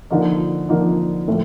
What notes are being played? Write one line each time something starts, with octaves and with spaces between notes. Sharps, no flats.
D3 F3 A#3 D#4
D3 F3 A#3 D#4
A2 F3 A3